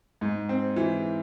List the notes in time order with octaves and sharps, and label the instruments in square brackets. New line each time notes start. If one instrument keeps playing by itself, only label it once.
[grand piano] G#2
C4
E3